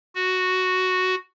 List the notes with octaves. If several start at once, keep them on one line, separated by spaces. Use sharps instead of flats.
F#4